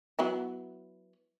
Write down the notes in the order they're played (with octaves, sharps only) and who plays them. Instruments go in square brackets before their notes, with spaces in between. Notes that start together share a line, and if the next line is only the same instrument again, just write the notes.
[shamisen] F#3 B3 E4